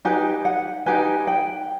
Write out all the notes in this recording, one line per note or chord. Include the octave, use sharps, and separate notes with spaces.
D#4 G4 B4 G#5
F#5
D#4 G4 B4 G#5
G5